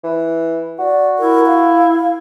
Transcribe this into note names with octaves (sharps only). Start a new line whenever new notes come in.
E3
F#4 D5
E4 A#4
F5